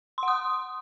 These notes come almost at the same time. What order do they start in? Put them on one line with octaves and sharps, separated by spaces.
C6 F#5 D#6